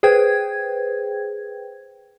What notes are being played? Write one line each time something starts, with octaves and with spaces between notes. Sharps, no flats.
G#4 B4 C5 G5 G#6